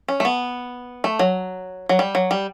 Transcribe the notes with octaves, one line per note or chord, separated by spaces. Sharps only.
C#4
A3
B3
A3
F#3
F#3
G3
F#3
G3